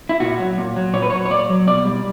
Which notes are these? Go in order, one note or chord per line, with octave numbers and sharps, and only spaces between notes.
E4
A#2 F#4
F#3
A#2
F#3
A#2 C#5
B4
F#3 C#5
C#5
A#2 D5
F#3
B2 D5
G3